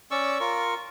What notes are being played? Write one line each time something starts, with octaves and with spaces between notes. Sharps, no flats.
C#4 D5 C#6 E6
F4 A#4 C#6